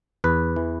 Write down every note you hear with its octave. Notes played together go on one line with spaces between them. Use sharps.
E2 B4
E3